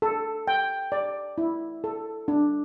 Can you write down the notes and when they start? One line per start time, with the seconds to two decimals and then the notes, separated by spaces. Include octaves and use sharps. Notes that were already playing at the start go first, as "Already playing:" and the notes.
0.02 A4
0.48 G5
0.92 D5
1.38 E4
1.84 A4
2.28 D4